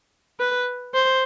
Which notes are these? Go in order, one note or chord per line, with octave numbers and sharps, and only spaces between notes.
B4
C5